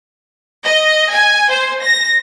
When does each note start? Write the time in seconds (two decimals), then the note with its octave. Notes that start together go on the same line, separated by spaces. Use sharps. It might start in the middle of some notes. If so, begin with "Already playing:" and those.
0.65 D#5
1.11 G#5
1.50 C5
1.84 A#6